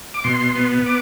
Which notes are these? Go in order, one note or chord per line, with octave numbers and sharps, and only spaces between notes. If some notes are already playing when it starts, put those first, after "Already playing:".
D6
B2 C6
B3
D6